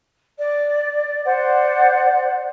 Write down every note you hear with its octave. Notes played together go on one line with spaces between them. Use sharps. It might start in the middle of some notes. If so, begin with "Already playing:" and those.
D5
C5 D5 F#5